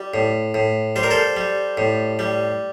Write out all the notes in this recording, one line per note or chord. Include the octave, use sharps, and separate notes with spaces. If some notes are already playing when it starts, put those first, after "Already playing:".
Already playing: G3
A2
A2
G3 C5
A#4
A4 C5
G3
A2
G3